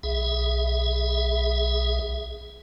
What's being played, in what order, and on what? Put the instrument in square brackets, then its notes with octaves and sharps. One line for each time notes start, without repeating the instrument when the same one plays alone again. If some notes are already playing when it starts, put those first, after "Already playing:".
[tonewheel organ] B1 G#4 E5